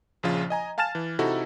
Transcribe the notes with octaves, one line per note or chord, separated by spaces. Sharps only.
A#1 C#3 F3 F4
D#5 G#5 A#5
F5 G#5 A5 F6 A6 E7
E3
C3 D#4 E4 F#4 A4